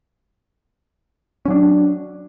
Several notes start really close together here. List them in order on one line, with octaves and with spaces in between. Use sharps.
C#4 F#3 D4